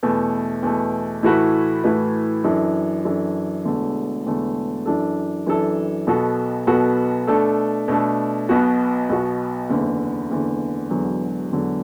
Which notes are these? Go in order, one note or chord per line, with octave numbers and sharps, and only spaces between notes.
E2 B2 A3
E2 B2 A3
A2 E3 A3 F#4 B4
A2 E3 A3 F#4 B4
F#2 E3 D4 A4
F#2 E3 D4 A4
E1 E2 D3 A3
E1 E2 D3 A3
F#2 E3 D4 A4
F#2 E3 D4 A4
B1 B2 B3 F#4 A4
B1 B2 B3 F#4 A4
B2 A3 D4 A4
B2 A3 D4 A4
B1 B2 B3 F#4
B1 B2 B3 F#4
F#1 E2 D3
F#1 E2 D3
E1 E2 D3 F#3
E1 E2 D3 F#3